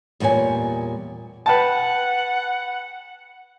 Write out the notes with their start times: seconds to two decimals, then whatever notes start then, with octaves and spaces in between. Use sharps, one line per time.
0.20 E2 A#2 G3 C#5 G#5
1.46 B4 F#5 G5 A5